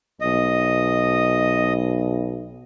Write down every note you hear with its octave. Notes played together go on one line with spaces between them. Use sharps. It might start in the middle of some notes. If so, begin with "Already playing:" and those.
B1 D#5